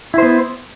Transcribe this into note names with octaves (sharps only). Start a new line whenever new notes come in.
B3 E4 C5